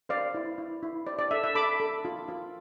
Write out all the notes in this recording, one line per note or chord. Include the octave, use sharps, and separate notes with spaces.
C5 D5 F5
E4
E4
E4
C5 D5
D5
A4 E5
E5
A4 B5 D6
A4
F4
F4